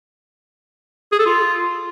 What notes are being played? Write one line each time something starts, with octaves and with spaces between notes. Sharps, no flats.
G#4
A4
F4